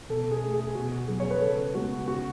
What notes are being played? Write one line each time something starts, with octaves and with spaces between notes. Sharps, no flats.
B2 A4
G#4
A3
G#4
B2 F#4
F#3 B3 G#4
C#5
B4
C#3 A4
G#3 B3 F#4
C#3 F#4